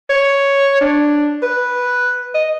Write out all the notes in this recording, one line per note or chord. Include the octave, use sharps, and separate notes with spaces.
C#5
D4
B4
D#5